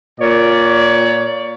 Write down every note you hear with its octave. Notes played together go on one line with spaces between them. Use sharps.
A#2 C#5 D5